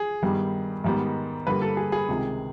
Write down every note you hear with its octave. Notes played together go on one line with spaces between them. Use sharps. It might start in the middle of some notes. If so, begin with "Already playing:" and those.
Already playing: G#4
G2 D#3 G3 B3
G#2 D#3 G3 B3
G2 D3 G3 A#3 B4
A4
G#4
G#4
C#2 C3 D#3